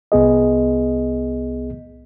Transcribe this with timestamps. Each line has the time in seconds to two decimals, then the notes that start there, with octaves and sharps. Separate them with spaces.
0.12 C2 B3 G#4 D#5